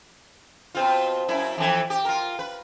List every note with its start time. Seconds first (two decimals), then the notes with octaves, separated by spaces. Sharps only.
0.75 B2 C4 F4
1.28 F#2 E4
1.58 F2 E3
1.90 G4
2.05 F4 A#4
2.39 B4